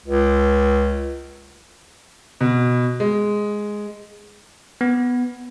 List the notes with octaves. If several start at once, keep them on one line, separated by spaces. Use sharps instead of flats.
C#2
B2
G#3
B3